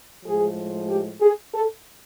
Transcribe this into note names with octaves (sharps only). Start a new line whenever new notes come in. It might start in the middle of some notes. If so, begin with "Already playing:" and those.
A2 F3 G#3 G#4
G4
G#4
A4